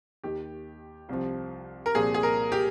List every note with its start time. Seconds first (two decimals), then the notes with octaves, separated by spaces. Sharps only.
0.24 D#2 D#3 G4
1.09 C2 C3 F3
1.86 A#4
1.95 C2 A#2 F3 G#4
2.14 G#4
2.23 A#4
2.52 G4